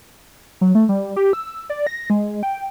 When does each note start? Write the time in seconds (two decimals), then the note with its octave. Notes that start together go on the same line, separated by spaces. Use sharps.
0.61 F#3
0.75 A3
0.89 G3
1.16 G4
1.33 E6
1.70 D5
1.87 A#6
2.10 G#3
2.43 G5